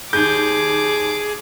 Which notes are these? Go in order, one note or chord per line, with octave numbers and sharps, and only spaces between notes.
D#2 G#4 D6 G6